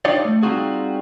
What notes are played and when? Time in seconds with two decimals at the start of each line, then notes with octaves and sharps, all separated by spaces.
0.05 D4 D#4 F4 G4 C#5 D5
0.25 A3
0.43 G3 C4 D#4 F4 F#4 G#4